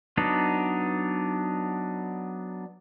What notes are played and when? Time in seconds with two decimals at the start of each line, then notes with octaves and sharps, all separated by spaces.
0.17 F#3 B3 D4 D#4